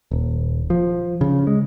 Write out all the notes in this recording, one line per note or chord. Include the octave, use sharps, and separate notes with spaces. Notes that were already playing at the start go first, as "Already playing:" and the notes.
D#1
F3
C#3
G#3